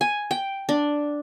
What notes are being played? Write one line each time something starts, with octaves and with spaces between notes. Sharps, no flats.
G#5
G5
D4